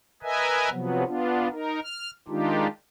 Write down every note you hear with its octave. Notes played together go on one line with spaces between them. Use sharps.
A#4 B4 D#5 E5 G#5
C3 F3 F#3 B3
B3 D4 F4
D#4 A#4
F6
D#3 G#3 D4 D#4 F4 G4